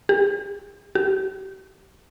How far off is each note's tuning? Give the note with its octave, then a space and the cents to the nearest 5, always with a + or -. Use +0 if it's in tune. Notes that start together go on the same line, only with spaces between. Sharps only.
G4 +40
G4 -40